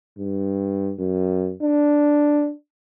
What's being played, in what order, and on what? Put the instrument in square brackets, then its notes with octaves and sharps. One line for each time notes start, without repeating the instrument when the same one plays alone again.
[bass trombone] G2
F#2
D4